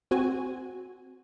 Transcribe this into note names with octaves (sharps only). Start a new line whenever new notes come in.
C4 F#4 G#5